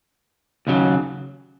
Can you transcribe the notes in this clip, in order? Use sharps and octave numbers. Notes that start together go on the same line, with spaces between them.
D#2 C#3 F#3